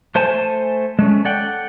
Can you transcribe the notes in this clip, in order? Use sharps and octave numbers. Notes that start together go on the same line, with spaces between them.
A3 C5 G#5 A5
G#3 A3 C#4
A4 D5 F#5 G5